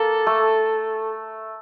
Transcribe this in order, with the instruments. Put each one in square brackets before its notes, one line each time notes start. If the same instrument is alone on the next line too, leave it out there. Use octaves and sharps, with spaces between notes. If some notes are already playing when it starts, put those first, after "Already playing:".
Already playing: [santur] A#3 [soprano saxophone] A4
[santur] A3